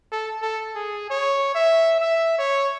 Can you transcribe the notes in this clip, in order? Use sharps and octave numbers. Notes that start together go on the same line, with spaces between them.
A4
A4
G#4
C#5
E5
E5
C#5